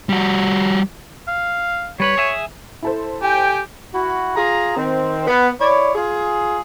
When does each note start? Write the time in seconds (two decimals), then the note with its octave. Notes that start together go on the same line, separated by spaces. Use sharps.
0.09 G3 F#4
1.28 F5
2.00 G3 B4 C#5 B5
2.17 G#4 E5 G#5
2.83 E4 A4 C5
3.22 G4 G5 G#5
3.94 E4 F#4
4.36 F4 G#4 A#5
4.76 D#3 C4
5.27 B3
5.59 E4 C#5 D5
5.95 F4 G#4